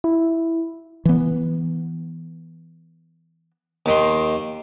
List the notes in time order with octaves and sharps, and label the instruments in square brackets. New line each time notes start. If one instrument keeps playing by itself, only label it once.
[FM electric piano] E4
[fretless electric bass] E3 B3
[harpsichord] D#2 D#3 C6